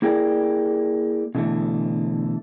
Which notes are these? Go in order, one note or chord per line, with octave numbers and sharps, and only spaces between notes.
A#3 E4 G4 G#4 A#4 D5
B2 D3 E3 A3